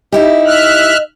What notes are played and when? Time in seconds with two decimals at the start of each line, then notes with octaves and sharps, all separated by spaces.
0.12 D#4 E4 G4 D#5
0.46 E5 F6 F#6